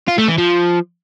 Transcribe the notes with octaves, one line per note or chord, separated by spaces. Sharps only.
F4
A3
E3
F3